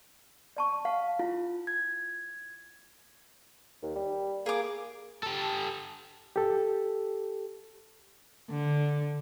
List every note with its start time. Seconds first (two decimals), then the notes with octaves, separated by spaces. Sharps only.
0.57 D5 A5 C#6
0.85 F5 F#5 A5
1.19 E4 F4
1.67 G#6
3.83 D#2
3.96 G3
4.46 A#3 G#4 D6
5.23 G4 A4
6.36 G4 A4
8.50 D3